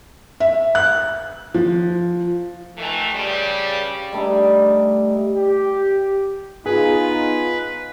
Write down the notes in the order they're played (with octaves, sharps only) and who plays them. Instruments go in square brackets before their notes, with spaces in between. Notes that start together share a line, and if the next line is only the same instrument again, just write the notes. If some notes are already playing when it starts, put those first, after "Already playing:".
[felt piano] E5
F#6
F3
[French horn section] D#3 E3 A3
G2 C#3 G3
[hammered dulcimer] G3 A3 D4 D#4
[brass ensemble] G4
[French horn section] B3 D#4 F4 [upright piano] G#4 [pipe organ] B4